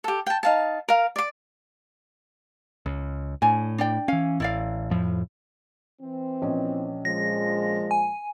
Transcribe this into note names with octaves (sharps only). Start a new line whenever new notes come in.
G4 A4
G5 A5
D#4 F5 A5
A#4 F5
D5 D6
C#2
A2 D4 G#5
D4 D5 G5
E3 C#4 F5
A1 E4 D5 F5
F2 A2 F3
E3 C4
A#1 C#4 D#5
A#2 F3 G#3 A#6
G#5